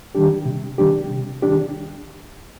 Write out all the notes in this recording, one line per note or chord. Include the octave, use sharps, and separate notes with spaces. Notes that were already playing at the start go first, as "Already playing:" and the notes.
D#3 G3 D4 G4
C3
D#3 G3 D4 G4
C3
D#3 G3 D4 G4